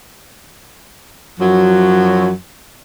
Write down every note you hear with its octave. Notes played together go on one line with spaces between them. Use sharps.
F#2 F3 F#3